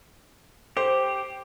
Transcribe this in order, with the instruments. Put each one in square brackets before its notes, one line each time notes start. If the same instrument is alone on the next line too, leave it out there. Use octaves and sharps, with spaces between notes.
[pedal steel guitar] G4 [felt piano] C5